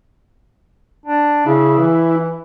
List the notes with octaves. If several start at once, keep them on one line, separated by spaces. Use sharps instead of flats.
D4
C#3 E4
E3